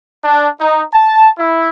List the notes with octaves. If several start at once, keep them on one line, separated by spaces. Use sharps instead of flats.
D4
D#4
A5
E4